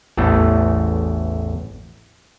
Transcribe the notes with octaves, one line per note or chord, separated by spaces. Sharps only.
A1 E2 E3 A3